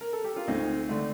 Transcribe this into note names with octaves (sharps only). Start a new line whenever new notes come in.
A#4
A4
G4
F4
D2 C4 D#4
D3 A3